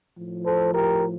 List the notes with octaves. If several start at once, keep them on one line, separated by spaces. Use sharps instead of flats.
A2 F3
A4 C5
G4 A#4